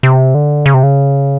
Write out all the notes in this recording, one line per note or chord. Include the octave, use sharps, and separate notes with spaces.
C3
D3
C#3
C3
C#3